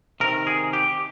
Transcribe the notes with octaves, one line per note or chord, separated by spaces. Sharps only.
C3 D#3 A#4
G#4
G4